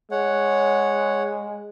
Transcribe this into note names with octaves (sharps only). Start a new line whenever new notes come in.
G#3 C#5 F#5